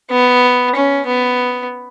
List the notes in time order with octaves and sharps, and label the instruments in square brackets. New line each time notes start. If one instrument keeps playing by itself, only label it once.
[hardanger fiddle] B3
C#4
B3